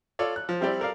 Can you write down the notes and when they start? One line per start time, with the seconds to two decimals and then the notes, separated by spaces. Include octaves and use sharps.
0.19 F4 A4 C#5 D5
0.36 F#6
0.49 F3
0.61 G3 C4 E4 G4 D5
0.80 A4 A#4 D5 F5